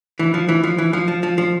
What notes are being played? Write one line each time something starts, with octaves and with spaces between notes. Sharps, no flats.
E3
F3
E3
F3
E3
F3
F3
F3
F3